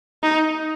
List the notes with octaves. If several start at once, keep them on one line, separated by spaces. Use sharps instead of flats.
D#4